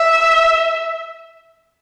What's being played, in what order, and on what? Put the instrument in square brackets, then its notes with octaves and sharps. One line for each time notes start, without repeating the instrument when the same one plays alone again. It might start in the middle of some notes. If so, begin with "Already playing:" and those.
Already playing: [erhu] E5